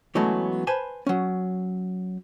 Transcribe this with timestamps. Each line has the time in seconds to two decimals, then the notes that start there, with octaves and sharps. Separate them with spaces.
0.15 E3 F#3 G#3 A3 B3 C#4
0.67 B4 C5 G#5 A5 B5
1.07 F#3 C#4